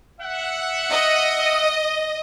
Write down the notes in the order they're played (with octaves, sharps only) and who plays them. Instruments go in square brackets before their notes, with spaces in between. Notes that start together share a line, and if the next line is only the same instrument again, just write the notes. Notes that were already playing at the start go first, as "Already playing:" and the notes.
[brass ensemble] E5 F#5
[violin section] D#5